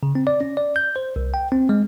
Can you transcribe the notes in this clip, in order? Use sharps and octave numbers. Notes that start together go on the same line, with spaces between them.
C#3
C4
D5
C#4
D5
G6
C5
C2
G5
C4
G#3